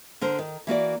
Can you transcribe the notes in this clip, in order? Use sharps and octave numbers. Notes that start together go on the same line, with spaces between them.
D3 A#4 C5
D#3
E3 A#3 F#4 D5